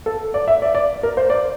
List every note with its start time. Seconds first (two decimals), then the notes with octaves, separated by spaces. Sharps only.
0.06 A4
0.34 D5
0.48 E5
0.62 D5
0.75 D5
1.03 A#4
1.17 C5
1.30 D5